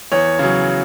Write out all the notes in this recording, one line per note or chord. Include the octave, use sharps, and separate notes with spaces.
E2 C#5
C#3 F#3